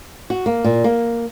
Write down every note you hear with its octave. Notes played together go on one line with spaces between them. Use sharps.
F#4
A#3
A#2
A#3